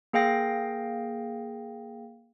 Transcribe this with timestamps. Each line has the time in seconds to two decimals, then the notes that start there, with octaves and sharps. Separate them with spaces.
0.13 A#3 G#4 F5 G5 A#6